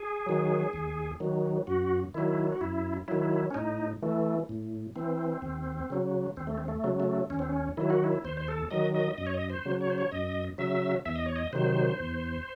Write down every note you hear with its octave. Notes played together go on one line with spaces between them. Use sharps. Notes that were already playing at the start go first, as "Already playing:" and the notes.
Already playing: G#4
D#3 F#3
D#2
D#3 F#3
F#2 F#4
D#3 F#3 E4
F#4
F#2 E4
D#3 F#3 E4
C#4
A2 D#4
E3 A3
A2
E3 C4
D#2
C#3 F#3
D#2 C4
A3
C4
A3
C#3 F#3
A3
D#2 C#4
C4
C#4
D#3 F#3 E4
F#4
E4
D#2 C5
C5
A4
D#3 F#3 D#5
D#5
F#2 D#5
C#5
D#5
C5
C#3 F#3
C#5
C5
C#5
F#2 D#5
C#3 F#3 E5
E2 E5
D#5
C#5
D#5
C3 D#3 F#3 C5
E2